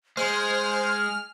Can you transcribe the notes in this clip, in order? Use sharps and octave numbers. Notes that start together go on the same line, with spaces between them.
G#3 C5 G#5 F6